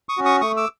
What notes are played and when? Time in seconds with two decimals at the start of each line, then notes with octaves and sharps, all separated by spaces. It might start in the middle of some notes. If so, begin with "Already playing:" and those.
0.09 C#6 D#6
0.17 C#4 F#4
0.25 C#6 D#6
0.41 A3 C#6 D#6
0.57 D6 E6